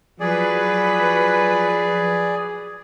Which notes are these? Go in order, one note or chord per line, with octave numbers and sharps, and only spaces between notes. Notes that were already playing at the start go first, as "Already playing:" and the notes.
F3 F#3 G#4 B4 D5